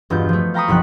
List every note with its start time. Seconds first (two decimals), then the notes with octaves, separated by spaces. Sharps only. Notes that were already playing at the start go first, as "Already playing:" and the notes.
0.10 E1 G2 B3 F4 G6
0.29 F3 A3
0.54 F5 G5 A#5 B5 C#6 D#6
0.68 F#1 B1 F3 F#6 B6